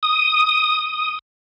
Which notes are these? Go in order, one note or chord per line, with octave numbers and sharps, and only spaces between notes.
D#6